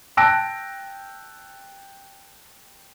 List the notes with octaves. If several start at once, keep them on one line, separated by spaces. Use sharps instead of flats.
G5 A5 E6 F#6 A#6 D7